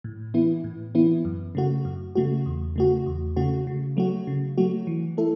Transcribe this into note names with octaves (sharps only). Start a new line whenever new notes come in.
A2
E3 B3 E4
A2
E3 B3 E4
F#2
C#3 A3 F#4
F#2
C#3 A3 F#4
E2
C#3 A3 F#4
E2
C#3 A3 F#4
C#3
F#3 A3 F#4
C#3
F#3 A3 F#4
E3
A3 E4 A4